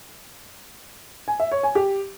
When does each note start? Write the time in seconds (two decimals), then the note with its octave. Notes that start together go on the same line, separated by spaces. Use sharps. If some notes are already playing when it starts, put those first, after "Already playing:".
1.28 G#5
1.40 E5
1.52 C#5
1.63 G#5
1.75 G4